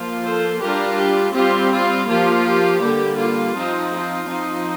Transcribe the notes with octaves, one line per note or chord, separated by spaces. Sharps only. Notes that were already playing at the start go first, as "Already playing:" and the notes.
Already playing: F3 A#3 F4
A4 C5
G3 D4 F4 G4 A#4
G4
G3 C4 F4 G4
F4
F3 A#3 F4 G4
G4
D3 G3 A#3
F4
F3 C4 D#4
F4
F3 C4 D#4